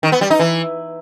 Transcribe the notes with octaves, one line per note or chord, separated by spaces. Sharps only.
D#3
B3
G3
D#4
E3